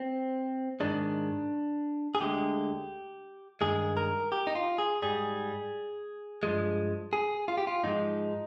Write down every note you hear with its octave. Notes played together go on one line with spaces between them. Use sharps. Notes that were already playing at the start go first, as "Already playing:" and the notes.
Already playing: C4
G#2 D#3 G#3 D4
G#4
D2 D3 G#3 G4
G2 D#3 G#3 G#4
A#4
G4
D#4
F4
G#4
G#2 G3 G#4
G2 F3 G#3
G#4
F4
G4
F4
G#2 F3 G#3 D#4